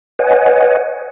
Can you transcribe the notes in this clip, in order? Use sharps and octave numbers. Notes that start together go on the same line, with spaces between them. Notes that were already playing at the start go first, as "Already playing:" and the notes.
B4 C#5 D#5 F#5 G#5